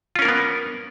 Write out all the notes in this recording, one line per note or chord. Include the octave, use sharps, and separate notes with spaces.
A#3 B3 C#4 F4 A#4